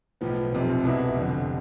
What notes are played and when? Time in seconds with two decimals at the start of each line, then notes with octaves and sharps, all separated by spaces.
0.21 B1 A2 F3 B3
0.53 F1 F2 C3 F3
0.83 C2 B2 B3 E4
1.15 F1 F2 D3